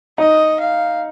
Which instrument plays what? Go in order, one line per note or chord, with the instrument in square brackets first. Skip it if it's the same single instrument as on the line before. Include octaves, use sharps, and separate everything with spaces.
[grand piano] D#4 [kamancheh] D#5
[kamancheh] F5